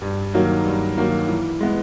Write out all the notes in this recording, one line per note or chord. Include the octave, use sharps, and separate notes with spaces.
G2
D#3 F#3 A#3
G2
D#3 F#3 A#3
E3
G#3 B3